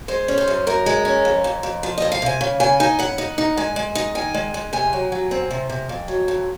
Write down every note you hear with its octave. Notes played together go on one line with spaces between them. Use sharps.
G#3 C5
C#4
C5
F#2
F#2 A#4
G#3
C#4
F2
F2
F2
F3
F2 D#5
F5
C3 G#5
C#3
C#3 G#5
D#4 G#5
C#3 F#5
D#4
D#4
G#3 G#5
G#3
D#4
D#3 G#5
G#3
G#3
C3 G#5
F#3
F#3
C4
C3
C3
F2
F#3
F2